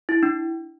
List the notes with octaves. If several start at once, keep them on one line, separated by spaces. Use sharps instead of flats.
E4
D4